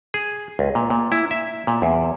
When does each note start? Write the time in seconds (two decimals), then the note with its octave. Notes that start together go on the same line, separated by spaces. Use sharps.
0.14 G#4
0.59 C#2
0.75 A#2
0.90 A#2
1.12 E4
1.31 E5
1.67 A#2
1.82 E2